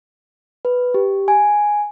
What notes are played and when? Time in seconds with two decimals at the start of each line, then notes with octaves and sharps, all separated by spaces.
0.65 B4
0.94 G4
1.28 G#5